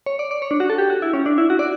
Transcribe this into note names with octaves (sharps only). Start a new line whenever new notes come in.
C#5
D5
D5
C#5
D4
F#4
A4
G4
F#4
E4
C#4
D4
E4
F#4
D5